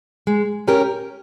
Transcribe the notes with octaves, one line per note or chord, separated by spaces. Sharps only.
G#3
C#4 G4 A#4